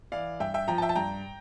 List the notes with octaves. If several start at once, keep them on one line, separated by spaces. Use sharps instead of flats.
E3 D5 F5
G2 E5 G5
E5 G5
F3 G5 A#5
A5
E5 G5
A5
G2 G5 A#5